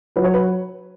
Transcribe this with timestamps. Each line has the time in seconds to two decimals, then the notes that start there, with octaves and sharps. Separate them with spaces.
0.16 F#3 B4
0.24 C#5
0.34 B4